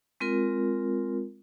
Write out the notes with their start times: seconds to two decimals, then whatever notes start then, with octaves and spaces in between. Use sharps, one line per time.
0.20 G#3 C4 F4 A#4